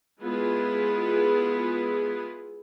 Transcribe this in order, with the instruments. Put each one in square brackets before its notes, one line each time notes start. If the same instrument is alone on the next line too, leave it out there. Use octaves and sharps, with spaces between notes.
[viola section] G#3 B3 E4 F4 G#4